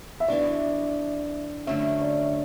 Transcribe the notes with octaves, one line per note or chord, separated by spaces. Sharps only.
E5
E3 B3 D4 F#4 D5
D3 F#3 A3 C#4 E5
D5